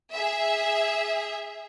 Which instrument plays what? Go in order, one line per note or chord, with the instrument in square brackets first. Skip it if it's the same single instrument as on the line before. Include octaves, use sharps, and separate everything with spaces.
[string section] G#4 E5